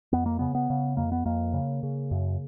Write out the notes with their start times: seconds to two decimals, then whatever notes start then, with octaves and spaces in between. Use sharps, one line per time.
0.13 F2 B3
0.26 A#3
0.39 C#3 B3
0.55 B3
0.70 C#3
0.97 F2 A#3
1.12 B3
1.25 F2 A#3
1.53 C#3
1.83 C#3
2.11 F#2